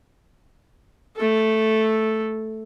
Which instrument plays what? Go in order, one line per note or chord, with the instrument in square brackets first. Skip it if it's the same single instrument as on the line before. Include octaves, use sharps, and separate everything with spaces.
[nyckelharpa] A3 A4